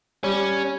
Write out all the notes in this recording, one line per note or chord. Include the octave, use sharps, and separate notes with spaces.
G3 C#4